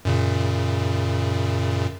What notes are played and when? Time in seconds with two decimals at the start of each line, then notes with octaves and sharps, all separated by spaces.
0.05 F#2 A#2 C#3